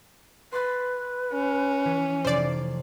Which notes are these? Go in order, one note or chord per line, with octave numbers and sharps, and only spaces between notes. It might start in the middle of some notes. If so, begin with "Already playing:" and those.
B4 C6 A6 B6
C#4
E3 C#5 B6
F1 C3 C5 D5 C7